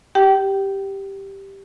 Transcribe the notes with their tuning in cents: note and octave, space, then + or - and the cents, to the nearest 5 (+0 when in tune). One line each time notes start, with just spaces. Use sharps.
G4 +0 G5 -25